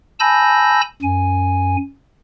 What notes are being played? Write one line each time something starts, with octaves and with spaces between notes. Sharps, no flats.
G#5 A5 B5 E6 G6 A#6
F#2 G#5